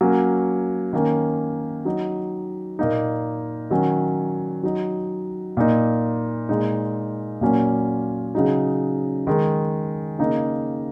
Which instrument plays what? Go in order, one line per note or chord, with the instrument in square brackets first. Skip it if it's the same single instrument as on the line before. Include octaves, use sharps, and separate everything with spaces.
[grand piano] F#3 A#3 C#4
D#3 A#3 C#4
F#3 D#4
A#2 A#3 D#4
D#3 F#3 C#4
F#3 D#4
A#2 A#3 D#4
A#2 G#3 D#4
A#2 F#3 A#3 C#4
C#3 F#3 D#4
D#3 G#3 D#4
C#3 A#3 D#4